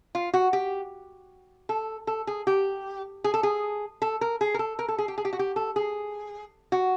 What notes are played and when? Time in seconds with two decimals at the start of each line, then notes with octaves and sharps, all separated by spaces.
0.15 F4
0.34 F#4
0.53 G4
1.69 A4
2.07 A4
2.27 G#4
2.47 G4
3.24 G#4
3.34 A4
3.43 G#4
4.02 A4
4.21 A#4
4.41 G#4
4.54 A#4
4.59 A4
4.79 A#4
4.88 A4
4.98 G#4
5.08 G4
5.18 G#4
5.25 G4
5.33 F#4
5.39 G4
5.56 A4
5.76 G#4
6.72 F#4